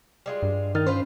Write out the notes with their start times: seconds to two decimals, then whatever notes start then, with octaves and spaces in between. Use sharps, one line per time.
0.26 G3 G#3 F4
0.43 G2
0.75 D#3 D#4 F6 A6
0.86 C#4 F4 B4 C5